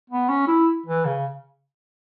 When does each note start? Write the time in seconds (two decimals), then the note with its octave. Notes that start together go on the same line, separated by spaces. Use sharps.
0.10 B3
0.29 C#4
0.47 E4
0.86 E3
1.05 C#3